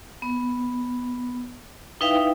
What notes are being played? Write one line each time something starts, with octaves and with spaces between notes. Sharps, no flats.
B3
D#4 E4 B4 E5 F5 G5